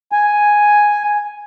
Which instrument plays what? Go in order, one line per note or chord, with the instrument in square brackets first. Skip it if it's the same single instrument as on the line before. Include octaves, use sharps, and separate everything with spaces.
[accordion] G#5